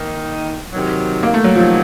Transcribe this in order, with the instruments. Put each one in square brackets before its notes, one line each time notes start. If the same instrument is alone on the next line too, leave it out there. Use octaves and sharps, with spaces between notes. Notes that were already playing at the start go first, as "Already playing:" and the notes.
Already playing: [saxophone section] D#3 A#3 D#4
C3 D#3 F#3
[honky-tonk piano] A#3
A3
F#3
[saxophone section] C3 D#3 F#3 [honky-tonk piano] F3